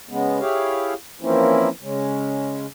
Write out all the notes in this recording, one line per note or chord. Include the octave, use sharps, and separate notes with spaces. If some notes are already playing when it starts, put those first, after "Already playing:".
C#3 G#3 B3
E4 G4 G#4 C#5 F5
E3 F3 A#3 C4 C#4 E4
C#3 G#3 C#4